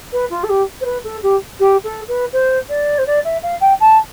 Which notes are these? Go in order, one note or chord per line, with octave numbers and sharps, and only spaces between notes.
B4
F4
A4
G4
C5
B4
A4
G4
G4
A4
B4
C5
D5
C5
D5
E5
F5
G5
A5